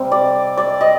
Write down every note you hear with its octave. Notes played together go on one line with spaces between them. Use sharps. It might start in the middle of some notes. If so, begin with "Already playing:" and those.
Already playing: C3 G3 C4
D5
D5
D#5